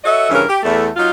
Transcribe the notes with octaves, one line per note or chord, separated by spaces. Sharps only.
F#4 A4 C#5 D#5 E5
G2 C#3 E3 C#4 A#4
G4
E2 A3
F#3 D#4 F4